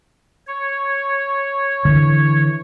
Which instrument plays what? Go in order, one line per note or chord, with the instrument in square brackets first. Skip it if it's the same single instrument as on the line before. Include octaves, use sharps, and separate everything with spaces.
[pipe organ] C#5
[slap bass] D3 E3